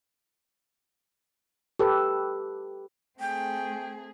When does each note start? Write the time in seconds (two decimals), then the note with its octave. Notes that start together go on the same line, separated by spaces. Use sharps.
1.79 G4 A4 B4
3.20 A3 C4 G#4 G5